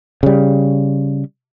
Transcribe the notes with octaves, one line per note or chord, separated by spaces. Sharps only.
C#3 G3